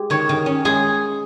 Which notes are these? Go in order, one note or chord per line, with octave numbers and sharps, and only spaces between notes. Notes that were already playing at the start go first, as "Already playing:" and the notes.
Already playing: G#3 G4
D#3 C#5
D#3
C#4
G#3 G#4